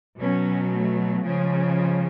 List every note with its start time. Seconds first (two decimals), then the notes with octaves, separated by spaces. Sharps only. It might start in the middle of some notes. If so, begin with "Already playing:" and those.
0.19 B2 F#3 C#4
0.71 A3
1.21 C#3 F3 G#3